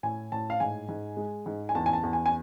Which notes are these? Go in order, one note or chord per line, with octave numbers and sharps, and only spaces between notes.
A2 G#5
A2 A5
F5
G#2 G#5
G#2
G#3
G#2
G#5
E2 A5
G#5
A5
E2
G#5
G#5